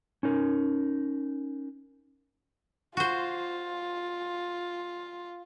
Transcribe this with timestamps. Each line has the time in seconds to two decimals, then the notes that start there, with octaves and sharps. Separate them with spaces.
0.23 C#4 D#4 A#4
2.97 F4 F#4 C5